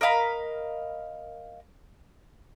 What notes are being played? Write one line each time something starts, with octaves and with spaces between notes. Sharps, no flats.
A#4 D#5 F5 B5